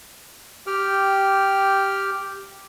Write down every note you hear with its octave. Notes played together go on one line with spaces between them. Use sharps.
G4 G5 F6